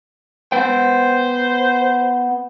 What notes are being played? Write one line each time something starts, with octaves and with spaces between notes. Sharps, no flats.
B3 C5 G5